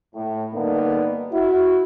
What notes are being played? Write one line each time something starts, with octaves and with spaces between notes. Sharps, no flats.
A2
G2 D3 A#3 B3 D4 D#4
E4 F#4